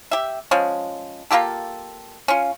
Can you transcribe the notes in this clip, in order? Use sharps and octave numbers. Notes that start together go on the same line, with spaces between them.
G4 E5
F3 G#3 C#4
A#3 F4 G4 A4
C#4 F4